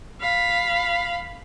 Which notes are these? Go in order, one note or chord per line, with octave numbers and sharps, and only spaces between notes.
F5 B5